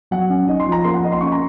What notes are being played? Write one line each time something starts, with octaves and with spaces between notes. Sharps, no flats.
F#3 F#5
C#4
D#4 D#5
C6
F3
A#5
A#3 C6
F#5
A#3 D#5
C6
C#4 C#6
A#5